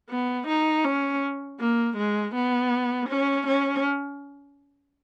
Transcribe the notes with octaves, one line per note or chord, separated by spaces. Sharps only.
B3
D#4
C#4
A#3
G#3
B3
C#4
C#4